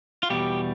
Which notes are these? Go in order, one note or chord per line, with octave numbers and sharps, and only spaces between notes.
F4
E2 B2 G3 G4